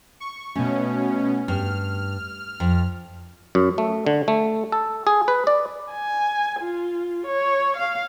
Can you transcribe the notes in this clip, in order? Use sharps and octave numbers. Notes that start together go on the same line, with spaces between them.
C#6
B2 A3 C#4
G2 F6
F2
F#2
A3
D3
A3
A4
G#4
B4
D5
G#5
F4
C#5
F5